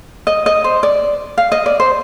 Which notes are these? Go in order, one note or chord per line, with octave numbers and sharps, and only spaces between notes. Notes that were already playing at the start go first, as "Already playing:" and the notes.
D#5
D#5
C5
D5
F5
D#5
D5
C5